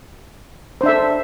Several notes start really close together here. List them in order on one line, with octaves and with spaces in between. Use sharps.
C5 D4 E5 A4